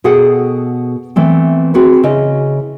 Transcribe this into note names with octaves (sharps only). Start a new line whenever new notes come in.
B2 F#4 G#4 A4 F#5 G5
E3 A3 B3 C4
C4 F#4 G#4 B4
C#3 E4 D#5